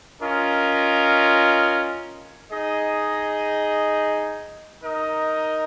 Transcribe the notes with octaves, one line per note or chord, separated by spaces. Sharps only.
C#4 F4 A#4 D#5
D#4 G#4 D#5
D#4 A#4 D#5